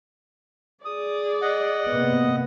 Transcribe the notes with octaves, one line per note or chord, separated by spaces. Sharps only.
G#4 D5 D#6
D#5 F#5
C3 A#3 B3